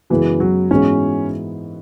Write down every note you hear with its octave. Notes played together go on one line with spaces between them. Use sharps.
F#2 C#3 E3 G#3 B3 F#4
F#3
G#2 E3 G#3 B3 C#4 F#4